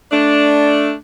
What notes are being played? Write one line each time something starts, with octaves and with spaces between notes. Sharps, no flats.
A3 D4